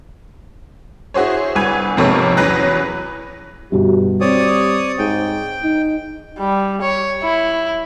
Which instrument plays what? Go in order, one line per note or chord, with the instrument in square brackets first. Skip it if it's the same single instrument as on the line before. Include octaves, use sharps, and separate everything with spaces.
[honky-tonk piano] E4 F#4 G#4 C5 C#5
G1 C2 B4 G#5 G#6
F2 G#2 C3 A#3 B3 C#5
E2 F#3 C#4 B4 F#6 A#6
[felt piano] G1 B2 [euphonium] G4
[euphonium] G3 [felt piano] C4 [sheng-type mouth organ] C#5 D5 D#6
[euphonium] G#2 [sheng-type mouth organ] G5
[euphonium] D#4
[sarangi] G3
C#5
E4